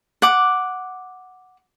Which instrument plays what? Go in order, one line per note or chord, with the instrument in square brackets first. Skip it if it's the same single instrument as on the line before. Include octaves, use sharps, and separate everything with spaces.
[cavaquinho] F#5 D6